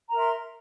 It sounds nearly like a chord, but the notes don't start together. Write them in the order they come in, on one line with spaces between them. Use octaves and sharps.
A#5 A#4 E5 C6